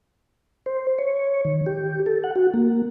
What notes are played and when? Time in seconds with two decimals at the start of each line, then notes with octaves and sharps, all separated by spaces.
0.66 C5
0.98 C#5
1.45 D#3
1.66 G4
2.06 A4
2.24 F#5
2.36 F#4
2.54 A#3